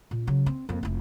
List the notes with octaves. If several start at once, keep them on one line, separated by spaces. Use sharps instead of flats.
A#2
C#3 F#3
C4
F2 A#3
F1 E4